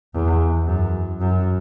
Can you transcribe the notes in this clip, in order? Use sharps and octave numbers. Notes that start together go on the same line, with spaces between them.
E2
F#2
F#2